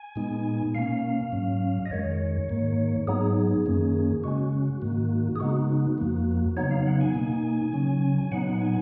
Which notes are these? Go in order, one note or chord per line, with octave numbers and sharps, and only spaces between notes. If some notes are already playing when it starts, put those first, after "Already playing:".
Already playing: G#5
A#2 G#3 B3 D#4
B2 A#3 C#4 F5
G#2 F#3 C#4
D#5
F2 D#3 G#3 C#5
G#2 D#3 A#3
G#2 F#3 B3 D#4 G#4
F#2 D#3 A#3 C#4
C#3 G#3 C#4 F#4
G#2 D#3 A#3
G#4
C#3 G#3 B3 D#4 F#4
F2 F3 A#3
C#3 F#3 B3 D#4 C#5
F5
F#5
G#5
B2 A#3 D#4
C#3 F#3 C#4
G#5
A#2 F#3 B3 D#4 F#5
G#5